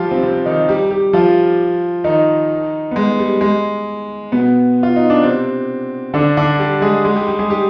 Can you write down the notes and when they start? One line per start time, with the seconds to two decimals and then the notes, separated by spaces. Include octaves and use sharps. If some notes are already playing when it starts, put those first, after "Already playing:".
Already playing: F3 G3 F4 G4
0.11 C3 C4
0.22 C3 C4
0.45 D#3 D#4
0.69 G3 G4
0.91 G3 G4
1.13 F3 F4
2.04 D#3 D#4
2.91 B3
2.96 G#3
3.19 G3
3.41 G#3
4.32 B2 B3
4.83 F4
4.96 D#4
5.10 D4
5.22 C3 C4
6.14 D3 D4
6.37 D3 D4
6.59 G3 G4
6.82 G#3 G#4
7.05 G#3 G#4
7.16 G3 G4
7.27 G3 G4
7.39 G#3 G#4
7.50 G3 G4